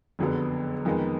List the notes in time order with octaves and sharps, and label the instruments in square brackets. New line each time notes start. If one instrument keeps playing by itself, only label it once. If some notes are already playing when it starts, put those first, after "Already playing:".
[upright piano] F#1 F2 D3 F#3 B3
F2 D#3 G#3 B3